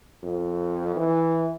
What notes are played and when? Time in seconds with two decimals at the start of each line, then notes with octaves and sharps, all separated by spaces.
0.23 F2
0.96 E3